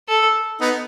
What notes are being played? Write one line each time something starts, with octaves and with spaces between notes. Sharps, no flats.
A4
B3 D#4